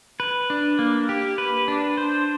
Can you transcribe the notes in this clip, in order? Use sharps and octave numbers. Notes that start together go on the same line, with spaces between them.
B4
D4
A#3
G4
B4
D4
C5